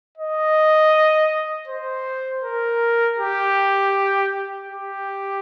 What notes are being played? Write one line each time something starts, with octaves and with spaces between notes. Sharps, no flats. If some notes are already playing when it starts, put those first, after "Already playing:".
D#5
C5
A#4
G4
G4